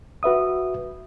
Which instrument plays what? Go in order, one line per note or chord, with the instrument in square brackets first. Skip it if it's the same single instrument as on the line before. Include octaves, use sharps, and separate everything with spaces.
[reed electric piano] F#4 B4 E5 D#6